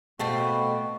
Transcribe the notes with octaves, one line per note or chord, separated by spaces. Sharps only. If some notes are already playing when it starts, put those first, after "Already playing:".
B2 A3 C4 F#4 F5 A5